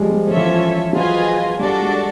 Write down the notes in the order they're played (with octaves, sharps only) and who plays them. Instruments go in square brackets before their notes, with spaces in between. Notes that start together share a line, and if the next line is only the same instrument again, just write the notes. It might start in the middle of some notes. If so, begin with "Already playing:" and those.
Already playing: [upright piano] F3 G3 G#3
G3
[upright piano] F3 [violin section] C#4 F4 A4 C#5 E5
[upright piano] E3
F3
[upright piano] F#3 [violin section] F4 G#4 B4 D#5 G#5
[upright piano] G3 [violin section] D4 F#4 A4 D5
[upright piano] G#3